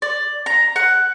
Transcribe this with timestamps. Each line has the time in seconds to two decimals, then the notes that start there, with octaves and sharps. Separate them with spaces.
0.02 D5
0.46 A#5
0.76 F#5